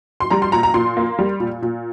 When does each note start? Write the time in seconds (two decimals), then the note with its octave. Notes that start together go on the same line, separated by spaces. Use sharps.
0.20 C6
0.30 G3 A#5
0.42 C6
0.52 A#2 A#5
0.63 A#5
0.74 A#2 C6
0.97 A#3
1.19 G3
1.40 A#2
1.62 A#2